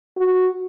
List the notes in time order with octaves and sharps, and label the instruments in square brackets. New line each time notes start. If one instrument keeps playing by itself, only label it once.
[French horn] F#4